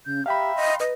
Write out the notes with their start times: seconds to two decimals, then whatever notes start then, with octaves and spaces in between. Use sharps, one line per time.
0.06 C#3 G6
0.26 G4 E5 F5 G5 A#5 B5
0.56 D#5 C6
0.80 B4 D#5